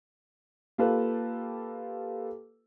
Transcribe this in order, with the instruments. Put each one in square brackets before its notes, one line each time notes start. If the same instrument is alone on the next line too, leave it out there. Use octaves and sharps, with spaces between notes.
[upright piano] A#3 F4 G4 A4 B4